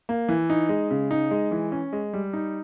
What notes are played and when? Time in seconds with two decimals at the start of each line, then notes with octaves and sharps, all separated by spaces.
0.09 A#3
0.29 E3
0.50 D#4
0.69 G#3
0.91 C#3
1.11 D#4
1.31 G#3
1.51 E3
1.72 C#4
1.93 G#3
2.13 G3
2.33 D#4